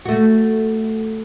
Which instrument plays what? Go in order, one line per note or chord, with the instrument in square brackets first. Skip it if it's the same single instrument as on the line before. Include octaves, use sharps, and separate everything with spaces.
[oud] A3 F#4